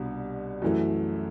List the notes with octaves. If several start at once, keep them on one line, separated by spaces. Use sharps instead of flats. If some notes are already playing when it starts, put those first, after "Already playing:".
Already playing: C2 B2 G3 D4
F#2 E3 A3